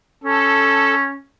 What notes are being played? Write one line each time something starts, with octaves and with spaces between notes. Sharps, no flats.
C#4 A4